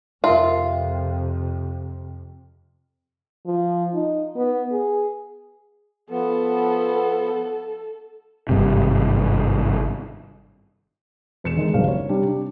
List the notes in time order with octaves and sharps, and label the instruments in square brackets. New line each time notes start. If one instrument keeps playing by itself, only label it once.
[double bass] F2 C3 [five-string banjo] F4 [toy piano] A#4 E5 C6
[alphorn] F3
D#4
B3
G#4
[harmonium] F3 B3 [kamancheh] A4
[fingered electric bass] G#1 G2 C3
[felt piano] E1 C#7 E7
D3 D#3 G#3
F#1 B1 G2 F5
C#5
C3 G3 D4
D4